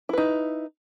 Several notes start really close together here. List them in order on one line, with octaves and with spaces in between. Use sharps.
E4 B4 D#4